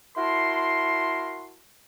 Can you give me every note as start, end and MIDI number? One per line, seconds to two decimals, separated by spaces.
0.16 1.57 64
0.16 1.57 66
0.16 1.57 70
0.16 1.57 81
0.16 1.57 84